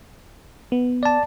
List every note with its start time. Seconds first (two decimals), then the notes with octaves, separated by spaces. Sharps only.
0.72 B3
1.03 D5 A5